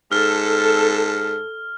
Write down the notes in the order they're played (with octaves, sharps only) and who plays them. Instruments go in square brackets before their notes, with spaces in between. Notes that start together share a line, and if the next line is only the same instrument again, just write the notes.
[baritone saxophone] G#2 [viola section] A4 [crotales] F6